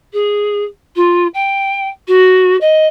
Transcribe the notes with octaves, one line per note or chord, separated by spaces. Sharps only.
G#4
F4
G5
F#4
D#5